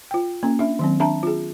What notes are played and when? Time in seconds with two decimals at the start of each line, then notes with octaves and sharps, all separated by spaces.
0.11 F4 G5
0.43 A#3 C#4
0.59 D4 E5
0.79 D#3 F#3 C4
1.00 D4 E5 A5 A#5
1.23 F4 G#4